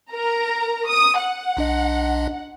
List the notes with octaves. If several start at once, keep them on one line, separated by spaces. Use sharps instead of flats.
A#4 A#5
D#6
F#5
B1 D4 D#5